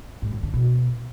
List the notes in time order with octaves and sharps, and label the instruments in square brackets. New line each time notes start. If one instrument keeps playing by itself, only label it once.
[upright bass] G#2
D#3
D3
B2